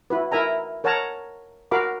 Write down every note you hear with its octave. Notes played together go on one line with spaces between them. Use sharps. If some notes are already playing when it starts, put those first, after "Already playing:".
E4 F#4 B4
E4 A#4 E5 G#5 A#5
A#4 C#5 F#5 A5 A#5
F#4 A#4 F5 B5 D6